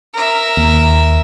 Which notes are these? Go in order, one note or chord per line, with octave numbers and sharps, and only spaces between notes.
A#4 E5
D#2